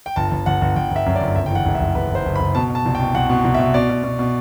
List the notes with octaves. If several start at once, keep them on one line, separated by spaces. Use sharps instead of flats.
G5
G1 A5
G1
G1 F#5
G1
G1 G5
G1
E5
F#2
D5
G1
F#1 E5
G5
E3 F#5
F#1
E5
F#1
F#1 B4
F#1 C5
F#1
B5
F#1
B2 A5
B2
A5
C2
G5
B2
C2 F#5
B2
C2
E5
B2
B2 D5
B2
B2
B2